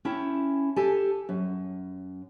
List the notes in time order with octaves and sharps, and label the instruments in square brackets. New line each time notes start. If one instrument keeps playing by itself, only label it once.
[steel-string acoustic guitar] C#4 E4 G5 A5
G4 A4 G#5 A5
F#2